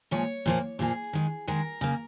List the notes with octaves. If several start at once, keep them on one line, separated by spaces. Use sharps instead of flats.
A#2 F3 G#3 C#5
A#2 F3 A#3
A#2 F3 A#3 G#4
D#3 G#3
D#3 G#3 A#4
C#3 A#3